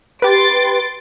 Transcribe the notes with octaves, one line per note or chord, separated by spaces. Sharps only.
G4 B4 C6 A6 D7